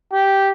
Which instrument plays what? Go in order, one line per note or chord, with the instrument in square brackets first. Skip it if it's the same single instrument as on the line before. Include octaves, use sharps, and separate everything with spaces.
[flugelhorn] G4